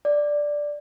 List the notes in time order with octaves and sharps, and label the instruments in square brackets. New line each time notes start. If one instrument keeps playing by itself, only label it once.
[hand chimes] D5